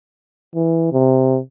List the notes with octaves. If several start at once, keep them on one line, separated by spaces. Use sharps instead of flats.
E3
C3